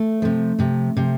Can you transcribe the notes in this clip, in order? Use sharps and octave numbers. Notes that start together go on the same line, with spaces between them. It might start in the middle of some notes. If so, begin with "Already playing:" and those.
Already playing: A3
C3 F3
C3 F3
C3 F3